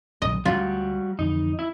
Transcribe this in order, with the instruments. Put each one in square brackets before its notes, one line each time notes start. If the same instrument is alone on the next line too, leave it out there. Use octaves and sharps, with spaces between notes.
[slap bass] D#1 B1 D3 [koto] D#5
[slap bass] D2 G#3 [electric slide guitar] G3 F#4 [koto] F4
[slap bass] F2 D3 E3 [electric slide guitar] D#4
[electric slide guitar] E4